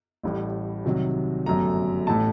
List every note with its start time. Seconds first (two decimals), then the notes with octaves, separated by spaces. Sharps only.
0.23 A1 A2 G3
0.84 C2 C3 D#3 F#3
1.46 G1 F#2 F#3 A3 A#5
2.07 A1 A2 A3 A5